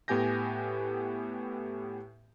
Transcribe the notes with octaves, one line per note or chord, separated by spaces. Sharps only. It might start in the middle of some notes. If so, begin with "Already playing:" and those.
A2 B3 G4 G#5 G6 A#6